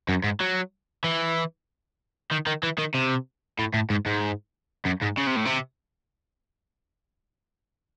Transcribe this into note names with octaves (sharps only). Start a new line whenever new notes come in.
F#2
G#2
F#3
E3
D#3
D#3
E3
D#3
C3
A2
A2
G#2
G#2
F#2
G#2
C#3
C3
A2
C3